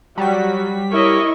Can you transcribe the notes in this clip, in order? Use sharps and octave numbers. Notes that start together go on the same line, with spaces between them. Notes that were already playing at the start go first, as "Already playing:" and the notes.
F#3 G3 F#4 B6
E4 A#4 C#5 D#5 C#6